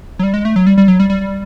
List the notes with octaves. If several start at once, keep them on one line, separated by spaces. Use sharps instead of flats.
F#3
G3
G#3
A3
F#3
G3
G3
F#3
G3
G3